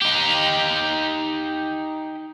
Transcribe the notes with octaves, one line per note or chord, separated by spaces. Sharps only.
D#4 G4